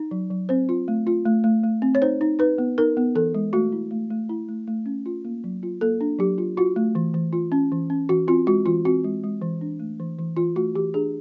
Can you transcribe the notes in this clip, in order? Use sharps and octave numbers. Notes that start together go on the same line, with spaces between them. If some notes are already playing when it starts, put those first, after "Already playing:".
Already playing: D#4
F#3
F#3
C4 C5
F4
A3
F4
A3
A3
A3
C4
C#5
D#4 C5
D#4
D#4 B4
B3
D#4 A#4
B3
E3 A4
G#3
A3 F#4
E4
A3
A3
E4
A3
A3
C#4
F4
A#3
F#3
F4
A#3 A4
D4
F#3 G4
F4
F4 F#4
A3
E3
E3
F4
C#4
E3
C#4
E3 F#4
C4 F4
G#3 F#4
E3 F4
C4 F#4
G#3
G#3
E3
D4
A3
E3
E3
E3 F4
A3 F#4
E3 G4
D4 G#4